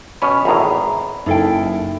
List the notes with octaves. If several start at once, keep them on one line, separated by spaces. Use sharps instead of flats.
B2 C#4 G#5 B5
G#1 E2 A2 G#4 A#5
F#1 D#4 E4 G#4 A4 G5